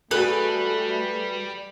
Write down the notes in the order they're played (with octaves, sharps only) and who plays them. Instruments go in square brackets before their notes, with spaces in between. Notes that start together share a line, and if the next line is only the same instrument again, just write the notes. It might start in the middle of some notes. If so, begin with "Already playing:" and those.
[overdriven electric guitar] G3 [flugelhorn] A3 [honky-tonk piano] F#4 G#4 A4 [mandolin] B4